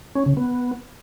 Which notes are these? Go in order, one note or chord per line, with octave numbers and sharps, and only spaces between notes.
C#4
C#3
B3